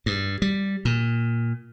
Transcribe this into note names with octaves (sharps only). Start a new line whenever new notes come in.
G2
G3
A#2